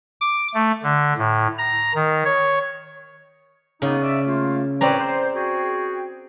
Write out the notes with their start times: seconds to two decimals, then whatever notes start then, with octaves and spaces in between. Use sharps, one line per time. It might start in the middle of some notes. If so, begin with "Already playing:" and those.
0.21 D6
0.54 A3
0.83 D3
1.18 A2
1.58 A#5
1.95 D#3
2.25 C#5
3.82 C#3 A#3 B3 D#4
4.02 D5 E5
4.26 A3 A#3 F4
4.81 A2 C4 B4 C#5 D5 A#5
5.00 C5
5.35 F#4 G#4 G5